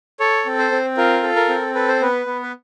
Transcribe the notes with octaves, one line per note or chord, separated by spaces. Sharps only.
A4 C#5
C4
C5
C4
F4 A#4
A4
A#4
C4
A4 B4
C5
B3 B4
B3
B4